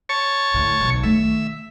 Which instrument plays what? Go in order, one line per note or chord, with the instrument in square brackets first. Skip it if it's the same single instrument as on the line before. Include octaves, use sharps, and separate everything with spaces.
[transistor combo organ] C#5 A5 C#6
[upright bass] D2 A2
B1 B2
[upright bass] D#3 A3 [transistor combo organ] E5